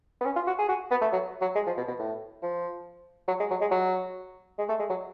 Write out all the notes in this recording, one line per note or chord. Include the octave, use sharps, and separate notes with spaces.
B3
C#4
F4
F#4
G#4
F#4
B3
A3
F#3
F#3
G#3
F3
B2
B2
A2
F3
F#3
G#3
F#3
G#3
F#3
G#3
A3
G#3
F#3